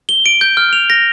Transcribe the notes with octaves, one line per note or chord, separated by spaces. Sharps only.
G7
D7
G6
F6
F7
A#6